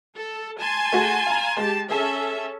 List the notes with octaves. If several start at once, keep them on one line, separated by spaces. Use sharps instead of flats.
A4
G#5 A5 C6
A3 F#4 G#4
F5 A#5
G#3 G4 A5
C#4 G#4 A4 E5 G#5 A5